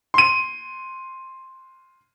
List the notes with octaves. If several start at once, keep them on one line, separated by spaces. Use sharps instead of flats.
C6 D#7